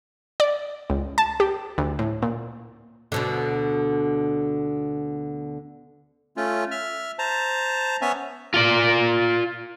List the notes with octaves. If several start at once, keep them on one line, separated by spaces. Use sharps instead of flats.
D5
C#2
A5
G4
D2
A2
A#2
D2 B2 D3
A3 C#4 F4
E5 F6
C5 A5 A#5
B3 C#4 C#5 E5 G#5
F4 D5